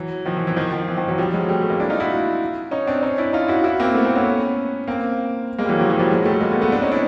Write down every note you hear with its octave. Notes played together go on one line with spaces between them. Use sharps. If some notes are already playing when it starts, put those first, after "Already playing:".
Already playing: E3 F#3
D#3 F3
E3
E3
D#3 F3
D#3 F3
E3
D#3 F3
E3 F#3
F3 G3
F#3 G#3
G3 A3
A3
G#3 A#3
D4 E4
D#4 F4
E4 F#4
C#4 D#4
C4 D4
C#4 D#4
D4 E4
D#4 F4
E4 F#4
E4 F#4
A#3 C4
A3 B3
A#3 C4
B3 C#4
A#3 C4
G#3 A#3
G3
E3 F#3
D#3 F3
E3 F#3
F3 G3
F#3 G#3
G3 A3
G#3 A#3
A3 B3
A3 B3
C4 D4
C#4 D#4
D4 E4